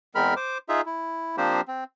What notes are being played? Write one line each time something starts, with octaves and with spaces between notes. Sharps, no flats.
E2 G#3 C4 A#4 B5 F6
C5 D6
D#4 F4 G#4 E5
E4
F3 A#3 C4 D4 G4 C5
C4